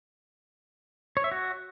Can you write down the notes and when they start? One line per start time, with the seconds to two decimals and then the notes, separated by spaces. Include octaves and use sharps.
1.17 C#5
1.24 E5
1.32 F#4